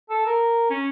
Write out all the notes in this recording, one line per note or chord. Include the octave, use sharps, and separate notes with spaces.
A4
A#4
C#4